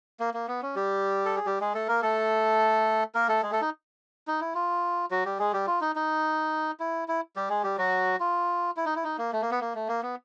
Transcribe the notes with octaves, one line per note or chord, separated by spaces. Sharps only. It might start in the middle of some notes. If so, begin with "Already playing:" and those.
A#3
A#3
B3
C#4
G3 G4
A4
G#4
G3 G4
G#3 G#4
A3 A4
A#3 A#4
A3 A4
A#3 A#4
A3 A4
G#3 G#4
A3 A4
D#4
D#4
E4
F4
F#3 F#4
G3 G4
G#3 G#4
G3 G4
F4
D#4
D#4
E4
E4
G3 G4
G#3 G#4
G3 G4
F#3 F#4
F4
E4
D#4
E4
D#4
A#3
A3
A#3
B3
A#3
A3
A#3
B3